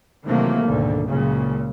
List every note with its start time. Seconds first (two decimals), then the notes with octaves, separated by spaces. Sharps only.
0.24 C3 D#3 E3 F#3 A3 A#3
0.63 G#1 D2 B2 D3
1.07 F#1 C#2 A#2 C#3 F#3